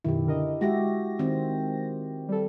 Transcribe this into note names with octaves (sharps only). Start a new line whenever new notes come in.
F#2 B2 D#3 E4 G4
D3 A#4 D#5
G#3 F#4 G4 E5 A#6
D#3 C4
G3 A4